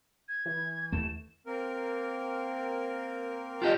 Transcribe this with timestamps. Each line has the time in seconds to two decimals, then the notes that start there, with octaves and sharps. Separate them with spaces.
0.28 G#6
0.46 E3
0.92 D#2 A3 E7
1.46 A#3 C4 A#4
3.62 A#2 F4 G4 D#5 G5 A5